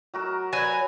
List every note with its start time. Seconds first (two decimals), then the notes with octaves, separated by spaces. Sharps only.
0.14 F#3 F#4 A#4
0.53 F#3 B4 G#5